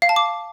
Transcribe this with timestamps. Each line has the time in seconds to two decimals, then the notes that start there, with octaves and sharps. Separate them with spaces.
0.02 F5
0.09 A5
0.16 D6